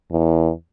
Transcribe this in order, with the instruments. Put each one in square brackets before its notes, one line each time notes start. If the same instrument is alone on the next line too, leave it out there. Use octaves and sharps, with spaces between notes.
[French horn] E2